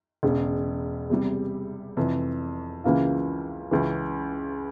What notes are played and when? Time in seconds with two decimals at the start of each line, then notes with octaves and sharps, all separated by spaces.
0.23 E1 E2 C#3
1.10 E2 C3 G3
1.97 F1 F2 E3
2.84 C#2 C#3 E3 A#3 F4
3.71 C#2 C#3 E3